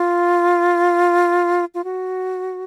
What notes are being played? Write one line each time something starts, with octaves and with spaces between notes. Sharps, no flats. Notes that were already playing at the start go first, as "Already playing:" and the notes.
Already playing: F4
F4
F#4